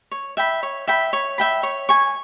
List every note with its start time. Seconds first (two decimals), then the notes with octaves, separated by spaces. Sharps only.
0.11 C#5
0.37 E5 G5 B5
0.63 C#5
0.88 E5 G5 B5
1.13 C#5
1.38 E5 G5 B5
1.63 C#5
1.89 G#5 C#6